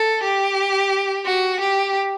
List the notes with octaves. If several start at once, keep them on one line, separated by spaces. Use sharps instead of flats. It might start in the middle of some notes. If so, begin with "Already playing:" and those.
Already playing: A4
G4
F#4
G4